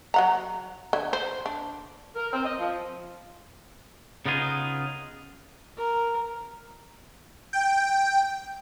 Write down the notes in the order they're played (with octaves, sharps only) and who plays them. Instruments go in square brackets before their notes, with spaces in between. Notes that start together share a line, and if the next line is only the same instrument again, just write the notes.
[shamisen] F#3 F#5 A#5
D3
C5
D4
[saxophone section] A#4
C4
D#5
F3
[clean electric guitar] C#3 B3 D#4 F4 G#4
[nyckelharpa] A#4
[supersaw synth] G5